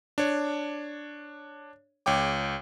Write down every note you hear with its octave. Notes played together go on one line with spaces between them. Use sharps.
D4 C#5
C#2 C#5 G5 D6